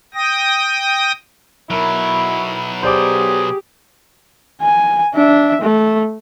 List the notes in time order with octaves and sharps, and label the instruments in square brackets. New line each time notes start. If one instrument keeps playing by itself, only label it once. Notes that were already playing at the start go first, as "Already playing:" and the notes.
[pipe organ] G5 D#6 A#6
[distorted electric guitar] B2 F#3 [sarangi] E4 [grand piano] A#4
[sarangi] G4 [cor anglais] G#4 [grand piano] C5 D5 D6
[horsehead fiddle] G#5
D4 E5
A3